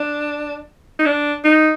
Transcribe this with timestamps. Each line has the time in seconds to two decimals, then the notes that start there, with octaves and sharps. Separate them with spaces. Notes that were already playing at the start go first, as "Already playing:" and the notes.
Already playing: D4
0.99 D#4
1.06 D4
1.45 D#4